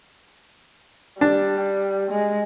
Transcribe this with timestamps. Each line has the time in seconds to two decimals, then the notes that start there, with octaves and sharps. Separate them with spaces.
1.21 G3 D4
2.11 G#3